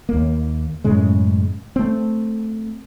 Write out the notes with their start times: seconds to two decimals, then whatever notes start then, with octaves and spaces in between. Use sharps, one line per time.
0.09 D#2 A#3
0.84 F#2 A2 C#3 G#3
1.76 A3 C4